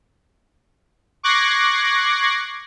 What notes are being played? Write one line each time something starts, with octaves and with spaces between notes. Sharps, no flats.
C#6 D6 F#6 G#6 A#6 C7